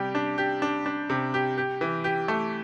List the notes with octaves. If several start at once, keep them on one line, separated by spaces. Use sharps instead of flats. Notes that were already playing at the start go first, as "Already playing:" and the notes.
Already playing: C3 G3 G4
D4
G4
D4
D4
C3
G4
G4
E3
G4
A3